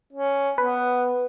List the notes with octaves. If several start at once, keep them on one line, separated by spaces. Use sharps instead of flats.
C#4
B3 B4